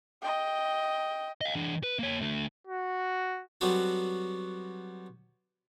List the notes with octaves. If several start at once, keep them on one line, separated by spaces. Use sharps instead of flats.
D#5 G5
D#5 F5
E3 D4
B4
A#3 C#5
D3 A3
F#4
F#3 G3 B3 C4 F#4 A4